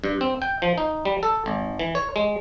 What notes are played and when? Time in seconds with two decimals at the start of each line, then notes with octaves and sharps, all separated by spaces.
0.04 G2
0.21 C4
0.42 G5
0.62 F3
0.78 D#4
1.05 G3
1.23 A4
1.46 G#1
1.79 E3
1.95 C#5
2.16 G#3